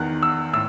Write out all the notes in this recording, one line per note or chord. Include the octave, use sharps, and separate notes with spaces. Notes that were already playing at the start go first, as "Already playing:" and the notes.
Already playing: E2 D#3 F#6
E6
A2 E6